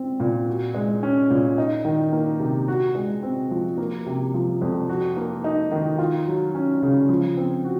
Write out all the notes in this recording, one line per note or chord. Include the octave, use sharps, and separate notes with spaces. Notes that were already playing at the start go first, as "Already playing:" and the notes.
Already playing: C4
A#2
F#4
G#3
C#4
A#2
D#4
D#3
A#3
C3
F#4
G#3
C4
F3
A#3
C3
F3
F2
F#4
A#3
D#4
D#3
F4
F#3
C#4
C#3
F3
C4
F#4